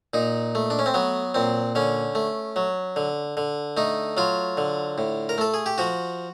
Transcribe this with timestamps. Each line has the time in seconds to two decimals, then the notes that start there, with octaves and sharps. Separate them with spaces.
0.14 A#2 D#4
0.55 A3
0.70 D4
0.79 C#4
0.86 C4
0.94 F#3 B3
1.34 A#2 C4
1.75 D3 C#4
2.15 A3
2.56 F#3
2.96 D3
3.37 D3
3.77 A3 D#4
4.17 F#3 F4
4.57 D3
4.98 A2
5.29 A#4
5.38 A3 A4
5.54 G#4
5.66 G4
5.78 F3 F#4